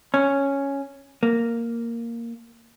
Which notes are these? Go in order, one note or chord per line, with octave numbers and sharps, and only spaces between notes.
C#4
A#3